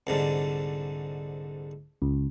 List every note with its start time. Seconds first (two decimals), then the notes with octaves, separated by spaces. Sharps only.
0.07 C2 G#2 D3
2.02 C#2